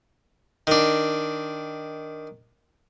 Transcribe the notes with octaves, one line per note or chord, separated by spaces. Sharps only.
D#3 D4